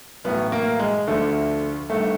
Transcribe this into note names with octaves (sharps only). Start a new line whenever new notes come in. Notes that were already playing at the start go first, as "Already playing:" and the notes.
B1 A2 E3 B3
A#3
G#3
D2 D3 F3 A3
G1 G2 D#3 A3